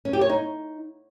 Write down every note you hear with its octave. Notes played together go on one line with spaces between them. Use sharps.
C#4
G4
C#5
D#4